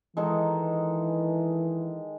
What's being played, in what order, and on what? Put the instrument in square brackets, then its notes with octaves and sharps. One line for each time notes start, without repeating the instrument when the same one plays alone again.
[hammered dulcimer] D#3 G#3 D#4 A4 [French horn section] E3